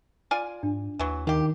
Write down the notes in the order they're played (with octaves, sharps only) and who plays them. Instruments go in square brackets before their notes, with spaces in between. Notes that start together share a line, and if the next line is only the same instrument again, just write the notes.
[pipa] F4 D5 G#5
[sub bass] G#2 [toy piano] D4
[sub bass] D#2 [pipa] E3 F#3
[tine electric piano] D#3 D#4 [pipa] F4 G4